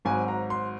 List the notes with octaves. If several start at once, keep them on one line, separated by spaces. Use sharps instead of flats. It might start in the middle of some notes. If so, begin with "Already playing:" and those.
G#1 G#2 F#3 G#5
A#5
C6